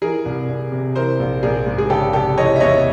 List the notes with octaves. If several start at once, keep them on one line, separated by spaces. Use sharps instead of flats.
E3 G#4 A#4
C2
C2
C3
E3 A#4 C5
A#1
A#1 G#4 A#4
G#2
G#4
C#3 G4 A4
F1 G4 A4
E3 C#5 D#5
E5
E2 C#5 D#5